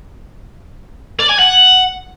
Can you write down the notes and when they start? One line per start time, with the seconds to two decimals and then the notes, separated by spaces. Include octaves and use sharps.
1.20 D5
1.29 G#5
1.39 F#5